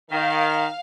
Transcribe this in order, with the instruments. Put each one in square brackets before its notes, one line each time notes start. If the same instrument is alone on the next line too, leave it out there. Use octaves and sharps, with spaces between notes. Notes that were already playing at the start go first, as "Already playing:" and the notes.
[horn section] D#3 [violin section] F5